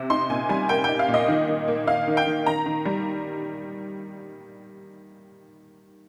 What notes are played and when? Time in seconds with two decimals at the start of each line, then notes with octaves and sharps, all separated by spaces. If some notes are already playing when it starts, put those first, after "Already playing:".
Already playing: C3
0.10 D#4 C6
0.30 A#2 G#5
0.49 G3 G#5
0.69 A#3 G5
0.84 D#4 G5
0.99 F5
1.08 A#2
1.14 D#5
1.28 D#3
1.48 D#3
1.68 A#3
1.87 D#4 F5
2.07 D#3
2.17 G5
2.26 D#3
2.46 D#3 A#5
2.66 D#3
2.85 G3